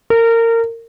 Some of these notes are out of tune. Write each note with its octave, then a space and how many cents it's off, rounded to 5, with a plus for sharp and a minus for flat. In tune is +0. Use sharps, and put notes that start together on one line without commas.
A#4 -25